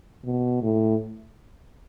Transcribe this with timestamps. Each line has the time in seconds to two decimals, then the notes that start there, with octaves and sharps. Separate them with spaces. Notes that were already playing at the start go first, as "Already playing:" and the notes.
0.25 B2
0.62 A2